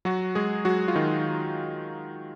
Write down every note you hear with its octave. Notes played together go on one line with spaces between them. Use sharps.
F#3 F#4
G#3 G#4
F#3 F#4
F4
D#3 D#4